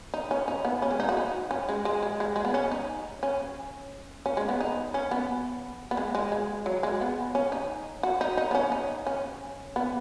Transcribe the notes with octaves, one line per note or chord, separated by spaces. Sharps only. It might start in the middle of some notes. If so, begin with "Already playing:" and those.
D#4
C#4
D#4
B3
C#4
G#3
D#4
F#4
D#4
C#4
G#3
G#3
G#3
G#3
G#3
B3
C#4
D#4
C#4
C#4
G#3
B3
D#4
C#4
B3
B3
G#3
G#3
G#3
F#3
G#3
B3
C#4
D#4
F#4
D#4
D#4
B3
C#4
D#4
C#4
B3